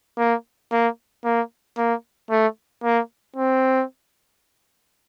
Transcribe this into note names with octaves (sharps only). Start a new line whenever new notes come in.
A#3
A#3
A#3
A#3
A3
A#3
C4